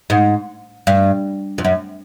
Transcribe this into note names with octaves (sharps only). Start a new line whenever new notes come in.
G#2
G2
F2
F#2